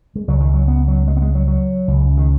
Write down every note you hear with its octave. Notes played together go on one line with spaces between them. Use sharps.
G#3
C#2 C#3 F#3
D#3
F#3
B3
F#3
G#3
B3
G#3
F#3
F#3
C#2 C#3
D#3